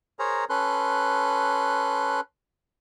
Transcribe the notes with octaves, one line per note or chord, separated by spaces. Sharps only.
G#4 A#4 C5 C#5 A#5
C#4 A4 B4 C6 F#6